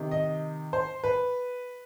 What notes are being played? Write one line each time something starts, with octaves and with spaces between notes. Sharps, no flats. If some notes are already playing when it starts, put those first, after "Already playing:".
Already playing: C3 D#3
D#5
C5
B4